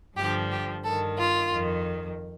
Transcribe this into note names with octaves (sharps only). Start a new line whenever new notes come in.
G2 D3 F3 G4
G4
G2 D#3 A4
F4
F2 D#3